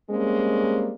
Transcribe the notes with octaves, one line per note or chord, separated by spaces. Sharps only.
G3 G#3 A#3 C4 C#4